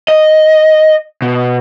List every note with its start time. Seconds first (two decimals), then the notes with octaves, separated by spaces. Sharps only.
0.08 D#5
1.22 B2